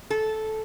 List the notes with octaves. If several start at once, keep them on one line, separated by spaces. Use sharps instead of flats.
A4